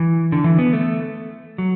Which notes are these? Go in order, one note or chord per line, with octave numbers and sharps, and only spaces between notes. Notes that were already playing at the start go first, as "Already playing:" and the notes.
Already playing: E3
D3
E3
B3
A3
F#3